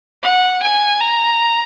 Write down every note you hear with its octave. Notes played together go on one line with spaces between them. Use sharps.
F#5
G#5
A#5